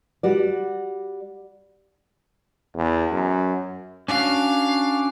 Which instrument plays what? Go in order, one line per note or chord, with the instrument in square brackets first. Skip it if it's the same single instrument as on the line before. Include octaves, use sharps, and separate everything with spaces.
[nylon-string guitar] G3 F#4 D5
[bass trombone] E2
F#2
[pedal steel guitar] C#4 D4 F#4 [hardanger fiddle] F5